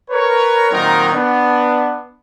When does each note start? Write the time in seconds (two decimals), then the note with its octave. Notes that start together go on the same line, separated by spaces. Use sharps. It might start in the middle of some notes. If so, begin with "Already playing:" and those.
0.10 A#4 B4 C#5
0.71 A#2 D#3 F#3 C4 D#4 A#4
1.14 B3 D4